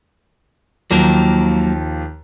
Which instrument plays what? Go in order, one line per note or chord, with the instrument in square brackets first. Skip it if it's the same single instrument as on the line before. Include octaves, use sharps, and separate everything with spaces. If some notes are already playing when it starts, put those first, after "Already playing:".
[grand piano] D#2 D#3 F3 [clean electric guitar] F#3 A#3 A#4